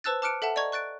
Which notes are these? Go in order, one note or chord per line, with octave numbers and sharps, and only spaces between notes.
B4 C5 A5 E6 F#6 A6
A5 D6 F6 F#6 C#7 D7
A4 E5 F#5 A5
D5 D#5 A#5 C#6 G#6
C#6 F#6 A6 D7